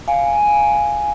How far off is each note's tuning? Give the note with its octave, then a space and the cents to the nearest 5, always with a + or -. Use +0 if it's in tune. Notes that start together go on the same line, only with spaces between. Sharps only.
F5 +0 G#5 +0